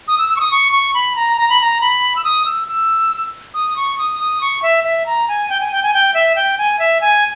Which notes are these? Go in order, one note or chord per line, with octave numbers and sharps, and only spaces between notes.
D#6
E6
E6
C#6
D#6
C#6
C#6
B5
A#5
A#5
B5
A#5
B5
E6
D#6
E6
E6
D#6
C#6
D#6
D#6
C#6
E5
E5
A#5
G#5
G5
G#5
G5
G#5
G5
E5
G5
G#5
E5
G#5